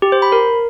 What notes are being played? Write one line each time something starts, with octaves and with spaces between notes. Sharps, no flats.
G4
C5
B5
A#4